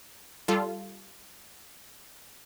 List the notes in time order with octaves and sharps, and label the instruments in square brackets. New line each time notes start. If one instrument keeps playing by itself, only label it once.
[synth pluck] G3 F4 A4